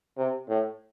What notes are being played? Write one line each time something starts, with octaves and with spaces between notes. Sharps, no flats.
C3
A2